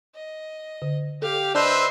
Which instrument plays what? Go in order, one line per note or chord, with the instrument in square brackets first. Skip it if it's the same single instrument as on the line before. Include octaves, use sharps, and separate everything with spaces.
[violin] D#5
[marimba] D3
[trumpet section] G4 [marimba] A4 [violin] F5
[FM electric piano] D4 C5 [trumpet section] B4 E5 C6 [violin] D#5 E6